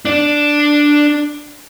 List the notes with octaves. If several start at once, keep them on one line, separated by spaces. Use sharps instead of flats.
D4 D5